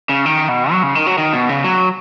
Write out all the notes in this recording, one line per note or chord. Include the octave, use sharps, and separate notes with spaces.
C#3
D#3
B2
F#3
C#3
D#3
F#3
D#3
B2
C#3
F#3